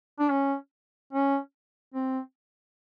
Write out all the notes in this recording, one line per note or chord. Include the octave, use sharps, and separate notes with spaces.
D4
C#4
C#4
C4